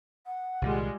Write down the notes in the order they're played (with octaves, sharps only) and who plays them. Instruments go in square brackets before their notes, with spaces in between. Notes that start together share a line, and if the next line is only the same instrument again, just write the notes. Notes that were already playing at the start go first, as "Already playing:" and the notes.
[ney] F#5
[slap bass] C2 A#2 D#3 [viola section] G3 G#3 F4